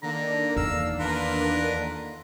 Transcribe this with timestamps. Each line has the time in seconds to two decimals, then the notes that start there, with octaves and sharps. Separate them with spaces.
0.03 D3 D#3 A#3 D4 A#5
0.57 E2 F5 E6
1.00 D3 F4 A#4 B4